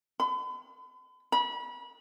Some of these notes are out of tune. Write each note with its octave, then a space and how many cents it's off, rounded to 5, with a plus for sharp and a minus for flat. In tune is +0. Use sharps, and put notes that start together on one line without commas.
B5 +45
B5 -30